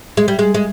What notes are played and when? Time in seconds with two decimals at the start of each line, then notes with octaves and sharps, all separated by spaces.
0.17 G#3
0.28 G3
0.39 G#3
0.54 G#3